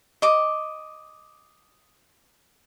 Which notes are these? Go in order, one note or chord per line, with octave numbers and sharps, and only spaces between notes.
D#5 D6